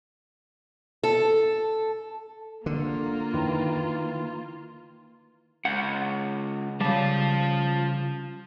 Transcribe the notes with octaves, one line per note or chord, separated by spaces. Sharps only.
A4
D3 A#3 F4
D#3 E4 B4
C#2 F#5
C#3 G3 F4 A5